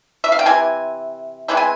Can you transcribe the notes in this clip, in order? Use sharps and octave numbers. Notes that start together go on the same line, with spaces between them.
E5
F5
G5
C3 E3 G#5
E3 G#3 C4 E4 G5
G#5